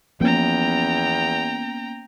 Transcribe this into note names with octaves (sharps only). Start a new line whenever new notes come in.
E2 F3 A#3 B3 C#4 G5 A#5